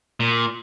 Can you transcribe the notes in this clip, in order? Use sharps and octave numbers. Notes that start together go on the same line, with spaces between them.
A#2